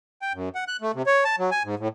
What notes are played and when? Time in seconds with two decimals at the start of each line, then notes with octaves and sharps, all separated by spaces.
0.22 G5
0.33 F#2
0.55 F#5
0.68 F#6
0.81 A3
0.95 C3
1.07 C#5
1.25 A5
1.39 F#3
1.51 G#5
1.64 G#2
1.79 A2